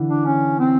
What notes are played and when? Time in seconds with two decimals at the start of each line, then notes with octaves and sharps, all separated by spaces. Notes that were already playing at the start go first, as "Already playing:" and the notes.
Already playing: D3 E3
0.09 D4
0.26 C#4
0.59 C4